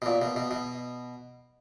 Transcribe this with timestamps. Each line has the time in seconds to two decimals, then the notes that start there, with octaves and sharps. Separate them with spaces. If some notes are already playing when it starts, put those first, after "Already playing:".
0.02 B2
0.06 A#2
0.22 B2
0.36 B2
0.51 B2